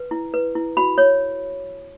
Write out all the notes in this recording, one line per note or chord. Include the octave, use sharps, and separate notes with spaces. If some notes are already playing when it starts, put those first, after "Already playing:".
Already playing: B4
E4
B4
E4
F#4 B5
C#5